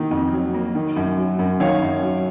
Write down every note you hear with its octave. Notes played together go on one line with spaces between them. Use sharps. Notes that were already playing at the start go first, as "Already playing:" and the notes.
Already playing: D#3 A#3
F2
F#3
A#3
D#3
F#2
F#3
F#2
D#3 C#5 F5
F#2
F#3